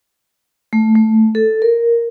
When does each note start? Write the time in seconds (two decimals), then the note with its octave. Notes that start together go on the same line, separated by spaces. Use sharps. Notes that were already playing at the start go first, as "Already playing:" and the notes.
0.73 A3
0.95 A3
1.35 A4
1.62 A#4